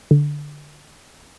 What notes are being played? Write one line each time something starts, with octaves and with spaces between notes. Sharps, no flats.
D3